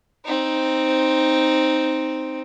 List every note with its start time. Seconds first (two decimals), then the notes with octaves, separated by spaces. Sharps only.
0.25 C4 D#4